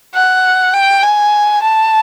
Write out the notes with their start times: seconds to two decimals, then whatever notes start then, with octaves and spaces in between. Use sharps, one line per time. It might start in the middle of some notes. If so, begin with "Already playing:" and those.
0.14 F#5
0.73 G5
1.03 G#5
1.62 A5